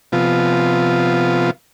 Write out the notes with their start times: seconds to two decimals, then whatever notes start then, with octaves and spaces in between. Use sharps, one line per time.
0.12 C3 F3 B3 F4